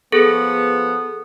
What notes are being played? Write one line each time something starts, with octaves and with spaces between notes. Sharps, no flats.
F3 B3 G#4 A4